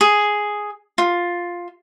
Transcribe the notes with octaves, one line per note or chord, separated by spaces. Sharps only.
G#4
F4